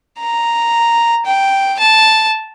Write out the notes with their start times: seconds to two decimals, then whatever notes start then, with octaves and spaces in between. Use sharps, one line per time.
0.20 A#5
1.26 G5
1.79 A5